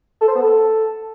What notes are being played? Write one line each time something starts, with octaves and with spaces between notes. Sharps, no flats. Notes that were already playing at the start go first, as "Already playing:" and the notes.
A4
C5
B3
A4